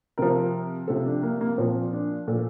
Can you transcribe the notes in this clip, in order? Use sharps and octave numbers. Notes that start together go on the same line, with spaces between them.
C3 F3 A#4
C3 F3 A4
D4
A#3
A#3
A#2 F3 C4
D4
A#2 F3 A4